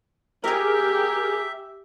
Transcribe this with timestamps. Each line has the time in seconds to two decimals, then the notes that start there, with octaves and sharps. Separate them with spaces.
0.44 G4 G#4 A#4 E5